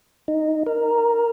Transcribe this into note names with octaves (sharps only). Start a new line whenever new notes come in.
D#4
A#4